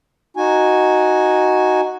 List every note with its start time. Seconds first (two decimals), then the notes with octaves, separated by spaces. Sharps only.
0.37 D#4 F#4 G#5